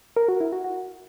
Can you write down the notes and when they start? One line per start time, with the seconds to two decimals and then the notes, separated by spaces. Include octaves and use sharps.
0.16 A#4
0.28 F#4
0.40 E4
0.52 F#4
0.64 F#4